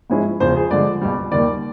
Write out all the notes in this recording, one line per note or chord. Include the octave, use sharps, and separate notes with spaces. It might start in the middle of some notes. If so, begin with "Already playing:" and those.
G#2 F3 G#3 C#4 E4
E2 C#3 F3 C5
G#4
G2 D3 F3 G#3 D5
C#2 B2 G3
D#2 D#3 G3 D5